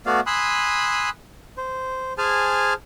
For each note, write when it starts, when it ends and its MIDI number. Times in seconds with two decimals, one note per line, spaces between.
0.06 0.20 57
0.06 0.20 59
0.06 0.20 66
0.06 0.20 74
0.06 0.20 77
0.26 1.10 80
0.26 1.10 83
0.26 1.10 84
0.26 1.10 87
0.26 1.10 88
0.26 1.10 90
1.57 2.13 72
2.18 2.74 68
2.18 2.74 72
2.18 2.74 80
2.18 2.74 81
2.18 2.74 89